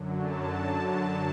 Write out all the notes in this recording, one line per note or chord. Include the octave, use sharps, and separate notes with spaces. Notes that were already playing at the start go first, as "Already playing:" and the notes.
Already playing: F#2 D3 F#3
A5